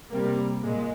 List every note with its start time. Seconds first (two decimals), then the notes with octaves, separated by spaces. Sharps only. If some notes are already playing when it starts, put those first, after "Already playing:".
0.11 C3 G3 A#3
0.64 A#2 G#3